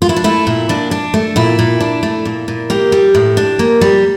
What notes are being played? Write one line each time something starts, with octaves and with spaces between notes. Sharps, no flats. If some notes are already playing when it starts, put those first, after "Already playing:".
D4 F4
E4
D4
A3 E4
A#2
A#2 D4
D4
A3
A#2 E4
A#2
D4
A3
A#2
A#2
A#3 G4
G3
A2
D4
A#3
G3